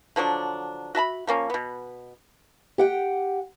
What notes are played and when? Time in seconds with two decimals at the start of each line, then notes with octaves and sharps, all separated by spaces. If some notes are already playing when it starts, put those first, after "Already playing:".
0.16 D3 F3 F#3 D4
0.95 F#4 E5 A5 B5
1.27 F3 A#3 C#4
1.50 B2 B3
2.78 G4 F#5 G5